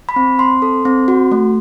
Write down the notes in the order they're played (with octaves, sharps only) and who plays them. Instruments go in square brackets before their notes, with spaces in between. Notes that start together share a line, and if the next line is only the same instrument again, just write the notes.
[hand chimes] B5
C4
C4 C6
A4
C4
F#4
A3